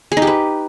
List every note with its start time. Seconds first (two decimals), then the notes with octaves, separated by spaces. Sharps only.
0.12 G#4
0.17 D#4
0.22 G4
0.27 B4